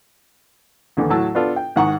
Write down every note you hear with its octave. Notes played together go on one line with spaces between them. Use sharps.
D#2 D3 E3
A2 F#3 A5 E6
B3 D4 F4 A4
G5
G#2 D#3 F#5 A#5 C#6